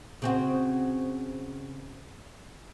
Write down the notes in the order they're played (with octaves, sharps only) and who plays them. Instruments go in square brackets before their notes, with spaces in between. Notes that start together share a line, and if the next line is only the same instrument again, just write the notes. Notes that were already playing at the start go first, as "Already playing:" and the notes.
[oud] C#3 C4 F#4